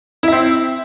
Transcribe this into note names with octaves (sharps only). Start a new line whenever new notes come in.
C4 E4 E5